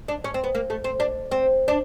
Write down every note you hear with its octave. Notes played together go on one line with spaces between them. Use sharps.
D4
C#4
C4
B3
A#3
A3
C4
D4
C4
D4